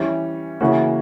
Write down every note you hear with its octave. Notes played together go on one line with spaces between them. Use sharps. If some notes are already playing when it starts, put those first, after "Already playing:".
Already playing: E3 G3 C#4
C#3 E3 A#3 C#4 F#4